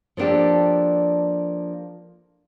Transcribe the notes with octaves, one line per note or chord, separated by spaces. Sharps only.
F3 A#3 D4 G4 A4